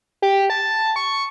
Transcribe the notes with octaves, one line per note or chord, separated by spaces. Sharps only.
G4
A5
C#6